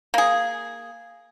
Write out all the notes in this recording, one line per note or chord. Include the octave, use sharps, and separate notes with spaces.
A#3 G#4